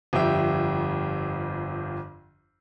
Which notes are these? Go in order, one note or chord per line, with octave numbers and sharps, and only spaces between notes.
G1 F2 G4 E5